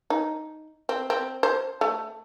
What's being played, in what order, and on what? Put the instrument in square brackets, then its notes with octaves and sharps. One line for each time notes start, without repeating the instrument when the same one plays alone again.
[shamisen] D#4
C4
C4
C5
A3